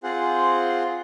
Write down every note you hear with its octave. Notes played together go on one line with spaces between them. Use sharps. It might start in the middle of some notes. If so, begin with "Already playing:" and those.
C4 F4 G#4 C5 F#5